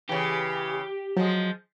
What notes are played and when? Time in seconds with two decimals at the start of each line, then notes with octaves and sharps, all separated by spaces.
0.09 C#3 E3 G4
1.17 F3 F#3 G#3